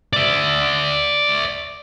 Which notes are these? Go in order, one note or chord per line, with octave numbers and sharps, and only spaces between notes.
D5 E5